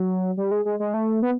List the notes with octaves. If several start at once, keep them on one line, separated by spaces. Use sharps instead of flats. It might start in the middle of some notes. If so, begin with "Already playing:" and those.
Already playing: F#3
G3
G#3
G#3
G#3
A3
B3